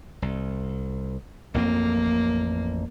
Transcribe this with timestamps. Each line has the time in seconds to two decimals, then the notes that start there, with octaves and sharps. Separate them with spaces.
0.22 C2
1.54 A1 F2 A#3 C4